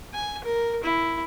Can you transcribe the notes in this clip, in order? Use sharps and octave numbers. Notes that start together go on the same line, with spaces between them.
G#5
A#4
E4